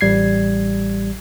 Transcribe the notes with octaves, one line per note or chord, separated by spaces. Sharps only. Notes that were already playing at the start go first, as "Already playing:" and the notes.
A1 G3 G#6 C7